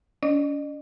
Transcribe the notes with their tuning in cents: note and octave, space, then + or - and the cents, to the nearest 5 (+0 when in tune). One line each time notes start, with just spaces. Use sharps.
C#4 +45 D#5 -45